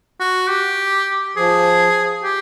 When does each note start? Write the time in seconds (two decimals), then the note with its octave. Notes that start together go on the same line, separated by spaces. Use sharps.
0.20 F#4
0.49 G4
1.36 F3 G#4
2.24 G4